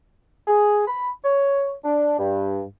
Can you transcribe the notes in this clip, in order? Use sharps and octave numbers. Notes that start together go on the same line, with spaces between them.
G#4
B5
C#5
D4
G2